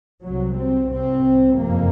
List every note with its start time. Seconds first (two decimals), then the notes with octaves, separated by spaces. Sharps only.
0.25 C2 F#3
0.30 C3
0.58 C4
0.91 C2 C3 C4
1.58 F#1 F2 C3 A#3